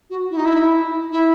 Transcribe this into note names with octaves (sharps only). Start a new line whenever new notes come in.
F#4
E4
D#4
E4
E4